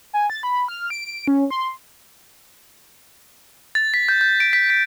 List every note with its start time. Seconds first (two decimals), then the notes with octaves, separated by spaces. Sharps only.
0.13 G#5
0.30 A6
0.43 B5
0.68 F6
0.90 D7
1.28 C#4
1.51 C6
3.75 A6
3.94 B6
4.09 G6
4.21 G6
4.40 D7
4.53 B6
4.70 B6